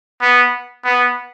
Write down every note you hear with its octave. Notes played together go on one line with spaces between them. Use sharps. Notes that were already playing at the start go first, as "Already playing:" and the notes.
B3
B3